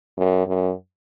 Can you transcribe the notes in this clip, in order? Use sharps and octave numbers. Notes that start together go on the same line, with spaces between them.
F#2
F#2